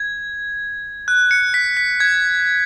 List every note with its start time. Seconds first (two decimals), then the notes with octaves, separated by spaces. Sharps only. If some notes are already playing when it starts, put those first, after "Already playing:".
Already playing: G#6
1.08 F#6
1.31 C#7
1.54 B6
1.77 B6
2.00 G#6